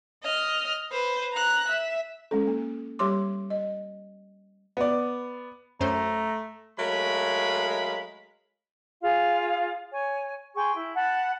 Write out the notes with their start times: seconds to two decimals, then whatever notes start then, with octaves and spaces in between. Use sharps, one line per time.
0.23 D#5 F6
0.92 B4 C5
1.34 A#5 F#6
1.68 E5
2.31 G#3 C#4 A4
2.47 A#3
2.99 G3 G4 C#5 C6 D6
3.50 D#5
4.77 B3 D5
5.80 F#2 A3 C#4 C5 A#5
6.78 F#3 G#3 A3 A#4 F5 B5
9.02 F4 G#4 F5
9.92 C#5 G#5
10.56 G#4 G5 C6 C#6
10.74 E4
10.95 F#5 A5 B5